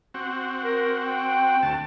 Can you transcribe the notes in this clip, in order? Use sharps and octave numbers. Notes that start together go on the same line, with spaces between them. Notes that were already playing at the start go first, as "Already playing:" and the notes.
C4 F#4
A#4
G5
D2 A5